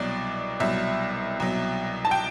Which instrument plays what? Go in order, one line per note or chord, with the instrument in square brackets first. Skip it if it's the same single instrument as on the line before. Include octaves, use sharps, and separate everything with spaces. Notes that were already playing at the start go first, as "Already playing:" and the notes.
Already playing: [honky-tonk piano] C2 B2 F#3 D5
C2 B2 F#3 E5
C2 B2 F#3
A5
G5